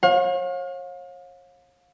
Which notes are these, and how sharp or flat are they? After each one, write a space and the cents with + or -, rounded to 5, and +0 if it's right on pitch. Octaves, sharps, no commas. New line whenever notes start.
C#5 -35 F5 +35